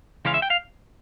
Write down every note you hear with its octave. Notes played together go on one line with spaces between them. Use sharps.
C#3 E3 G#3 C#4 F4 F5
E5
G5
F5